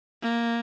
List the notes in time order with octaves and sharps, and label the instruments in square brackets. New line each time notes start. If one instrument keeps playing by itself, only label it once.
[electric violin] A#3